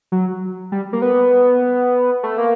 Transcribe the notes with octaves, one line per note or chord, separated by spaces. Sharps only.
F#3
G3
A#3
B3
A3
A#3